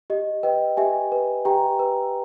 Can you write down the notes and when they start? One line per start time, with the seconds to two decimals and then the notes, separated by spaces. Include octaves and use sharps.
0.10 G4 D#5
0.43 B4 D#5 G5
0.77 G4 E5 G#5
1.12 B4
1.45 G4 G5 A#5
1.79 B4